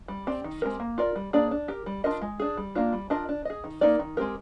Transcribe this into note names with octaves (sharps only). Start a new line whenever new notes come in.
G3
C4 G4 D5
D#3
G#3 C4 G4 A#4
A#3
F4 A#4 D5
G3
A#3 D4 G#4 D5
D4
G4 A#4
G3
D4 F4 A#4 D#5
G#3
D4 G#4
G3
A#3 D4 F4
G3
D4 F4 A#4 D#5
D4
G#4 D#5
D#3
A#3 D#4 A#4 D5
D#3
G#3 C4 G4 A#4